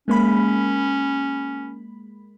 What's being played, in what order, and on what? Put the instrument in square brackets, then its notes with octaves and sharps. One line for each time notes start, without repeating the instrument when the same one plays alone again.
[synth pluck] G#3 A#3 B5 [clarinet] C#4